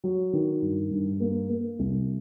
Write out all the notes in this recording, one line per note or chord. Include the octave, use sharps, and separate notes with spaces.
F#3
D#3
G2
G2
A#3
A#3
C2